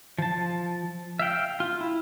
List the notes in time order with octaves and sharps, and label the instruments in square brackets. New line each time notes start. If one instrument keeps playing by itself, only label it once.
[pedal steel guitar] F3 A5
E5 F5 G5
F4
E4